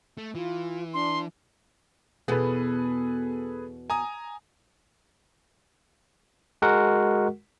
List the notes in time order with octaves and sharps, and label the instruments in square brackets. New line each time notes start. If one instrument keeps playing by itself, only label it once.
[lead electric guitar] A3
[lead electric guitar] E3 [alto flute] F4
[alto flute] D4 [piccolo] C6
[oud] E2 B2 B3 [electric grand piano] G#4 A4 B4
[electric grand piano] G#5 A#5 D#6
[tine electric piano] G#3 F#4 A#4 F#5